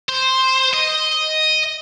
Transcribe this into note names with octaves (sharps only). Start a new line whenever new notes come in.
C5
D#5